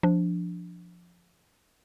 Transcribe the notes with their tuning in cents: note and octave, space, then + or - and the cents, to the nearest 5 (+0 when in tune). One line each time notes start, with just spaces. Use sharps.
F3 +0 D4 +0